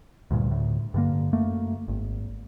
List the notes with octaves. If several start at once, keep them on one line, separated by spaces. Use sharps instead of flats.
D2 G2 A#2
D2 A2
G2 D3 A#3
F#2 A3 A#3
G#1